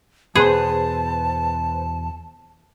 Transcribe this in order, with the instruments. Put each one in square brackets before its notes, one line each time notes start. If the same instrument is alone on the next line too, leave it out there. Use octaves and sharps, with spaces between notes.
[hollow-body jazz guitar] E2 B2 B3 [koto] G#4 [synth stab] B4 C5 [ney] A5